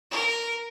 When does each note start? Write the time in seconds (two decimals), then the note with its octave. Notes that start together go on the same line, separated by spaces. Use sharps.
0.11 A#4